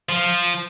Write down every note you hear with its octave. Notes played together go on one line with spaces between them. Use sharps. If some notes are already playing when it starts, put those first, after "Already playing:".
F3